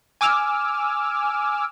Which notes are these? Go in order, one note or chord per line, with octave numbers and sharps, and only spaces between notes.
G#5 D6 E6 F6